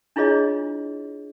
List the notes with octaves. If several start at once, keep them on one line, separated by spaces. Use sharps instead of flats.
D4 E4 F4 G#4 C#5 D#5